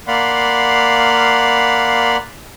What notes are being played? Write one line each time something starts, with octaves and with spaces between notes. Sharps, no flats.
A#3 D5 F5 F#5 B5 C6